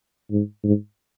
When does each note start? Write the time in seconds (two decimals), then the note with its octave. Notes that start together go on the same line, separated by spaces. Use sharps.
0.31 G#2
0.64 G#2